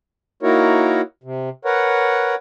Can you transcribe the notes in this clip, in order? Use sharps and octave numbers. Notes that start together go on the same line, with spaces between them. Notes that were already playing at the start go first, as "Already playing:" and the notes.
A#3 D#4 E4 F#4 A#4 C#5
C3
A#4 B4 C#5 F#5